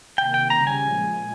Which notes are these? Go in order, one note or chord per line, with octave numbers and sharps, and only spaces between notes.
C3 D#3 A#3 G5
G5
C#3 G3 C#4 A#5
G#5
A#2 F3 G#3